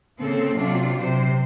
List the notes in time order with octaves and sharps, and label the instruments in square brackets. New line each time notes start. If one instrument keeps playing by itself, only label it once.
[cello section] C#3 A#3 C4 A4
C3 F#3 D4 F4
C3 C5